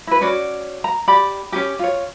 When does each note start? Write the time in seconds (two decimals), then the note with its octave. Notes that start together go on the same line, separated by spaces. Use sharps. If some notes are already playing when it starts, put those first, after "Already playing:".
0.07 E4 B4
0.21 C#4 F#4 C#5 D5
0.84 A#5
1.08 G4 D5 B5
1.52 C#4 F4 G4
1.79 F4 C#5